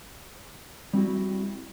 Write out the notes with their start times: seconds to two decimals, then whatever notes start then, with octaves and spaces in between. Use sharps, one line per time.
0.93 G3 C4 E4 F#4 G4